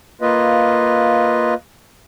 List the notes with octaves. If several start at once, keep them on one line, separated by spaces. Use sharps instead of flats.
A#3 F4 B4 D#5